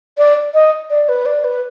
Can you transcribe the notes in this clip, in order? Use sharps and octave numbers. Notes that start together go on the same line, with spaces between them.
D5
D#5
D5
B4
D5
B4